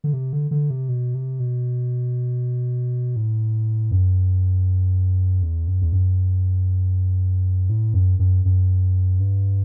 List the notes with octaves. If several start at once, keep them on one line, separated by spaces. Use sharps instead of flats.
D3
C3
D3
D3
C3
B2
C3
B2
A2
F#2
E2
F#2
E2
F#2
A2
F#2
F#2
F#2
G2